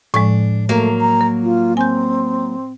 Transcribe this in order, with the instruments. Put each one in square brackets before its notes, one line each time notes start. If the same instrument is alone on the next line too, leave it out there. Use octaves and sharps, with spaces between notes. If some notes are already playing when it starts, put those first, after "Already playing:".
[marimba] A2 F3 G#3 [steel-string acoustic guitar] D4
[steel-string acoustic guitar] F#3 A#3 F5 [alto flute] A3
[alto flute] A#5
[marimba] A#4
[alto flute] F4
[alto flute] C4 [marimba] G#5 G6